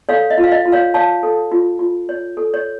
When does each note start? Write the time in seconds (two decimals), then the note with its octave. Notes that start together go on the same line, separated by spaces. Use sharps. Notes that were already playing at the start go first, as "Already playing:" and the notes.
0.09 A4 C#5 F5
0.30 D#5
0.38 F4
0.44 F5
0.52 D#5
0.65 F4
0.72 C#5 F5
0.94 C#5 F5 A5
1.23 A4
1.52 F4
1.79 F4
2.09 C#5
2.37 A4
2.54 C#5